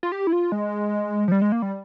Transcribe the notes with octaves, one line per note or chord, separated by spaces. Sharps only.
F4
G4
E4
F4
G#3
F3
G3
G#3
A#3
G3